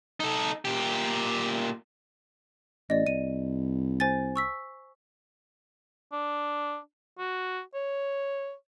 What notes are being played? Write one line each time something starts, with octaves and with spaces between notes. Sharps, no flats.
D#4 A4
A#2 G4
A1 D5 D#5
C2 D#7
C5 G#5 A6
C#6 E6 B6
D4
F#4
C#5